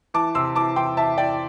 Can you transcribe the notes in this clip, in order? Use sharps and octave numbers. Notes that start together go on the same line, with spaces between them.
E3 A5 D6
C3 C6 E6
E3 A5 D6
E3 G5 C6
E3 E5 A5
E3 D5 G5